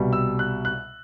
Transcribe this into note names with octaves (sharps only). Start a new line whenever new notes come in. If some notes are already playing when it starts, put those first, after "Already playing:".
Already playing: C2 B2 G3
E6
F#6
F#6